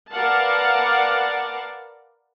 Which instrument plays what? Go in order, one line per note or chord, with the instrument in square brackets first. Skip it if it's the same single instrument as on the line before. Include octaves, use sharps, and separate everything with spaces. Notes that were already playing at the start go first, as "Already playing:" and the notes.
[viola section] A#4 B4 D5 F5 F#5 A5